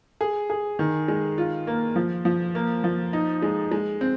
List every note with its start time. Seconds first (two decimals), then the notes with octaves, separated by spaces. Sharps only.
0.21 G#4
0.50 G#4
0.79 D#3
1.08 G#3
1.38 F4
1.67 A#3
1.96 F3
2.25 F3
2.55 A#3
2.84 F3
3.13 D#4
3.42 G#3
3.72 G#3
4.01 C4